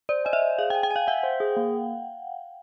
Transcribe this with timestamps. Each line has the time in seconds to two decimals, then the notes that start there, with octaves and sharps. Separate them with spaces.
0.09 C5 D5
0.25 D#5 G#5
0.33 E5
0.42 C5
0.59 G#4 F5
0.70 G5
0.75 G#5
0.83 G5
0.91 G#5
0.96 F5
1.07 E5 F#5
1.23 C5
1.40 G#4
1.57 A#3